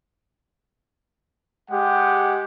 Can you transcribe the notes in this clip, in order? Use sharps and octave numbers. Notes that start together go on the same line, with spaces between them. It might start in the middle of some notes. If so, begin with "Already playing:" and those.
G#3 G4 F#5